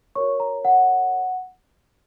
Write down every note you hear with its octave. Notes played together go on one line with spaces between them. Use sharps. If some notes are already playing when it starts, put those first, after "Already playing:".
F#4 A#4 C#5 C#6
A#5
F#5